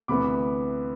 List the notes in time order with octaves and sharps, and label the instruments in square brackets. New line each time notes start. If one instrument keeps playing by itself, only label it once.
[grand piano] D2 C3 E3 B3 B5 D6